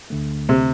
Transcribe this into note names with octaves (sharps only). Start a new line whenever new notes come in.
D2 D3 A3
C3